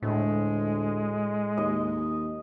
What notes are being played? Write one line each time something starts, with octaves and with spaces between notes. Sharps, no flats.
D2 A2 G#3
D#2 D#5